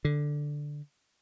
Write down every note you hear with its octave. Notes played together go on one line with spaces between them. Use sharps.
D3